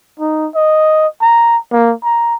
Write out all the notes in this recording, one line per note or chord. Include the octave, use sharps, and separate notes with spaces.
D#4
D#5
A#5
A#3
A#5